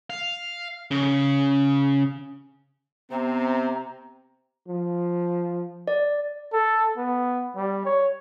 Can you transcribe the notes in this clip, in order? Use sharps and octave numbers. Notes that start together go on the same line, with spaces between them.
F5
C#3
C3 B3 C4 A#5
F3
D5
A4
B3
G3
C#5